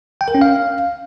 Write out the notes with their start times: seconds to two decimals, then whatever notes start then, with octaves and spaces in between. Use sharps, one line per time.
0.21 G5
0.28 A#4
0.35 C#4
0.41 F5